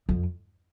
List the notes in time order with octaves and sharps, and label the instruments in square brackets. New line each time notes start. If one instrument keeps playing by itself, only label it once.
[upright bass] F2